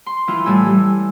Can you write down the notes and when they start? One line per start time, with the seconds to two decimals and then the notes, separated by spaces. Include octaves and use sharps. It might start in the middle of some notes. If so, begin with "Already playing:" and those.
0.06 C6
0.28 E3 E4 F4
0.46 A2 G3 G#5 E6
0.66 G3